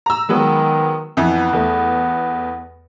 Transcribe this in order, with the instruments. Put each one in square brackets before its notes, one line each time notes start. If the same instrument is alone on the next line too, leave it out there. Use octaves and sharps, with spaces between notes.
[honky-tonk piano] A#5 E6
[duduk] D#3 [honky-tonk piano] F#3 G#3 B3
[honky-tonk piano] F2 E3 [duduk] B3
[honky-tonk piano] E2 A3